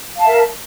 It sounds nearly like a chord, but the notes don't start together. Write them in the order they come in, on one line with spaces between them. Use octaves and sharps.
F5 A5 E5 A#4